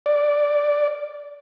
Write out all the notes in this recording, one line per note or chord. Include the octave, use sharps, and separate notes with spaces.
D5